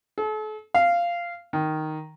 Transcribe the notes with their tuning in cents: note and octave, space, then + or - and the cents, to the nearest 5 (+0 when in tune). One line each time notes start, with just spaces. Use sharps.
A4 -40
F5 -10
D#3 +0